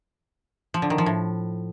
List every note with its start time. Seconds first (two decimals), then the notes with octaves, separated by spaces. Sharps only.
0.74 F3
0.82 D3
0.90 D#3
0.98 F3
1.06 A2